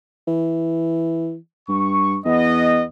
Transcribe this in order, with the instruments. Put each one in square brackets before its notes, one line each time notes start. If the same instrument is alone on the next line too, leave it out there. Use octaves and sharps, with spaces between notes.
[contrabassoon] E3
[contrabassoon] G2 [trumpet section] C#6
[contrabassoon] E2 [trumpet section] B3 D#5